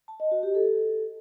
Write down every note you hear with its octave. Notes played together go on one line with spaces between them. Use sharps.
A5
D#5
F#4
G4
A4